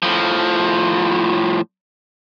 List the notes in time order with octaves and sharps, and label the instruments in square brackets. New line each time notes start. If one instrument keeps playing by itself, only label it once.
[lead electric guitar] A2 F3